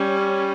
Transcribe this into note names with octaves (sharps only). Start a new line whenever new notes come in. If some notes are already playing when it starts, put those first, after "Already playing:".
Already playing: G3 C#4